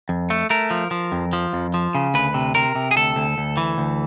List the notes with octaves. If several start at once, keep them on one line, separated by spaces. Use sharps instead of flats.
F2
A3
A3 A#4
F3
F3
F2
F3
F2
F3
C#3
D2 B4
C3
C3 A#4
C3
G#4
D2 A4
D2
D2
E3
D2